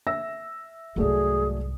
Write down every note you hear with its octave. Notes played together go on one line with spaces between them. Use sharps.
E5 E6 A#6
C2 G#2 F#3 A3 G#4 D5